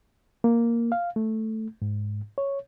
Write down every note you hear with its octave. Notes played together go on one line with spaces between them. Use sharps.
A#3
F5
A3
G#2
C#5